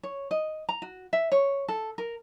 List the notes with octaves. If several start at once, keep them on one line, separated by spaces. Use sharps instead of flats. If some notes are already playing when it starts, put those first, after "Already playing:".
C#5
D#5
A#5
F#4
E5
C#5
A4
A#4